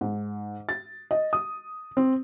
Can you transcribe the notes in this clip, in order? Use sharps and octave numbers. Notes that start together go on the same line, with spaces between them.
G#2
A6
D#5
D#6
C4